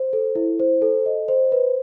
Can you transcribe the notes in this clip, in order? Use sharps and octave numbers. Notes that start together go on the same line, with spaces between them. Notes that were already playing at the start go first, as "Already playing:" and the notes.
Already playing: C5
A4
E4
C5
A4
D#5
C5
B4